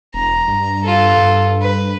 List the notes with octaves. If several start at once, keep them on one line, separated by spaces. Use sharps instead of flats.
E1 A#5
G2
F4 A4
G2
B4